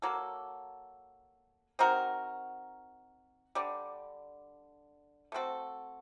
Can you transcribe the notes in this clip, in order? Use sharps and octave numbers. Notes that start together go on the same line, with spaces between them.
F#3 A#3 F#4 A4
C4 D#4 F#4 A#4
D3 G3 D4
A3 C4 F#4 A4